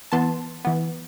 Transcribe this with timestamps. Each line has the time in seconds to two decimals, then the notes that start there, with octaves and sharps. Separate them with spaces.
0.12 E3 B3 A5 C6
0.65 E3 B3